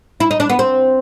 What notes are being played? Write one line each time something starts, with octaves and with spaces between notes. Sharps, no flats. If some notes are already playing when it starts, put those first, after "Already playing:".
E4
D#4
D4
B3
C4